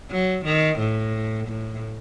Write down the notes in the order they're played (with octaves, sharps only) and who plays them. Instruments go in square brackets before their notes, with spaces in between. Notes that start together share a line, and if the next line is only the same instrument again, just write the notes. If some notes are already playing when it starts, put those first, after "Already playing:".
[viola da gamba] F#3
D#3
A2
A2